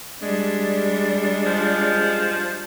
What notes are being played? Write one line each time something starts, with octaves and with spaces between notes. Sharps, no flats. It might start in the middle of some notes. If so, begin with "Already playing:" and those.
G3 G#3 D4
F3